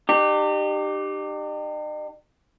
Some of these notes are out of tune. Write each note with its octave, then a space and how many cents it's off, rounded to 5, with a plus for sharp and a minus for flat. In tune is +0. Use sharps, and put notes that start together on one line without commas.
D#4 -45 G4 +0